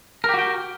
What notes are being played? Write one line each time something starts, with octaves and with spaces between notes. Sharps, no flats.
F#4 G4 A#4 G5